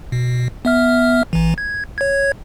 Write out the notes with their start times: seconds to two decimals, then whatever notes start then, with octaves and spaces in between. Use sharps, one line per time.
0.12 B2
0.65 B3 E5 F6
1.33 A1 E3
1.58 G#6
1.98 C#5 G#6